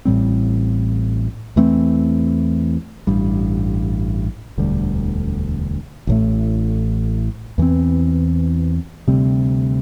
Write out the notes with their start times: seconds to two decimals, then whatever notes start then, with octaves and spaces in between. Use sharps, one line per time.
0.05 A1 A2 G3 C4
1.56 E2 E3 A3 C4
3.07 A1 G2 G3
4.58 E1 D2 D3 G3
6.07 A1 A2 A3
7.58 E2 E3 C4
9.08 D2 C3 G3 C4